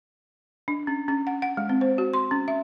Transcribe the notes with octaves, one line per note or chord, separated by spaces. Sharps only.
D4
C#4
C#4
F#5
F#5
G#3
C4
C5
F#4
C6
C#4
E5